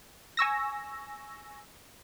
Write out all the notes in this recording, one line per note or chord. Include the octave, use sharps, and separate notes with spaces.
G#5 C#6 E6 A#6